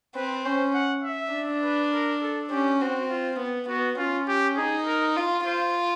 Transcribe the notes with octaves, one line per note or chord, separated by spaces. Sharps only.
C4 B4
C#4 C5
F#5
E5
D4
B4
A#4
A4
C#4 G4
C4 F#4
F4
B3
B3 F#4
C#4 F4
G4
D#4 G#4
A#4
F4
F4 C5